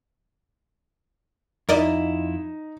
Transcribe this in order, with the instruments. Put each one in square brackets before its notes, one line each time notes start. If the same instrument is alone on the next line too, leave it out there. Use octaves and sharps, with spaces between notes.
[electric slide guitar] F2 E4 [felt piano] D#4 [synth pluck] A#4 D5 D#5